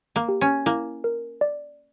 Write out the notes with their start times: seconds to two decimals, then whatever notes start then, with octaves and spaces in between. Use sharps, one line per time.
0.16 A#3
0.29 G4
0.41 C#4
0.66 A#3 E4
1.04 A#4
1.41 D5